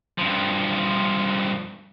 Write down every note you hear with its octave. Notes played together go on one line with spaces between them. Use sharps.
G2 F3